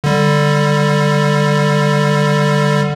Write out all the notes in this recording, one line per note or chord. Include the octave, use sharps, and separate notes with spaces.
D3 G3